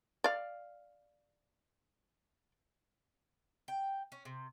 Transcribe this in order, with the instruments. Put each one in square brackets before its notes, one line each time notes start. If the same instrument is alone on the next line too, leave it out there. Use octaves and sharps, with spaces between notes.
[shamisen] D5 F5
[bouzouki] G5
C#4
C3